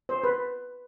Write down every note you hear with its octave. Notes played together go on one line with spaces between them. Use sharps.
C5
B4